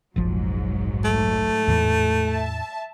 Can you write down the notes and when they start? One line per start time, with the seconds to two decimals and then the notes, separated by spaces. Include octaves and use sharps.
0.16 F1 A#1 G#2 F3 F#3
1.05 A3
1.68 E2 A2 E3
2.27 E5 A5